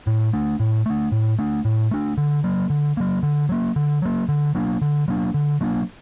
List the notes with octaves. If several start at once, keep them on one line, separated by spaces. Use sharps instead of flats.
A2
A3 D4
A2
A3 D4
A2
A3 D4
A2
A3 D4
D3
F#3 A#3
D3
F#3 A#3
D3
F#3 A#3
D3
F#3 A#3
D3
F#3 A#3 D4
D3
F#3 A#3 D4
D3
F#3 A#3 D4